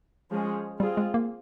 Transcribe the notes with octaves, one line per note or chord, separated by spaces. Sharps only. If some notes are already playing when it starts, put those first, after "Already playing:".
F3 G#3 C#4 G#4
G3 C4 F4 G#4
G#3
A#3